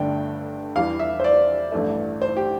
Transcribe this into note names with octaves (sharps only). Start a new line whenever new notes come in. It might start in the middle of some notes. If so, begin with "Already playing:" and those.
Already playing: G1 G2 D3 A3 D4 G5
E2 E3 G3 D4 F5
E5
C5
D5
A1 G2 E3 A3
C5
G4